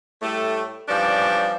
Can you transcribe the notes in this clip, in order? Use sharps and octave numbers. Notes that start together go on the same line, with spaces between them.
A2 G3 A3
E3 F3 G3 C#4 D4